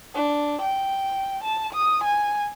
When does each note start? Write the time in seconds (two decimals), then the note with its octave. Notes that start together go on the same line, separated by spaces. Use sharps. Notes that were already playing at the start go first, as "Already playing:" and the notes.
0.14 D4
0.62 G5
1.44 A5
1.73 D#6
2.04 G#5